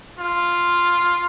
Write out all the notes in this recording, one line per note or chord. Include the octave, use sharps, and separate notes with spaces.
F4